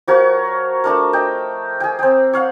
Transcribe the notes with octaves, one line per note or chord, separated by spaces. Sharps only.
F3 F#4 A#4 C#5
A3 D4 A#4
D#5 G5 D6
G#4 G5
C4 G5
C#5 F5 F#5